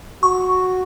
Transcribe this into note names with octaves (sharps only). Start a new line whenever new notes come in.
F#4 C#6